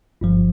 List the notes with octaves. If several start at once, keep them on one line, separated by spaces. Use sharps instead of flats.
G1 G2 F3